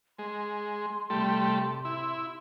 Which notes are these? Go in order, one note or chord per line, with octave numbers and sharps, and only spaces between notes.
G#3 C6
C3 G3 A3
E4